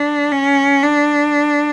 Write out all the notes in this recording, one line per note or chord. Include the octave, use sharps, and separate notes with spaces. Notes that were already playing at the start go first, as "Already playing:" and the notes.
Already playing: D4
C#4
D4